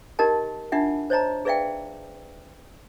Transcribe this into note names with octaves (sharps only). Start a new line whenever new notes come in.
D#4 G4 A#4 D#5 A5
D4 D#4 F4 E5 F#5
C5 C#5 D#5 A5 A#5
G#4 B4 D5 E5 F5 G5